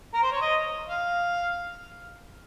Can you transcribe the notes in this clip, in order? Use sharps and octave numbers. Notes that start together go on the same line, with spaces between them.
A#4
C5
C#5
D#5
F5